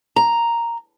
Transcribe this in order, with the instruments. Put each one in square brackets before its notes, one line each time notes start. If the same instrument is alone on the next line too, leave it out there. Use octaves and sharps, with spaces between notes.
[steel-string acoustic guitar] A#5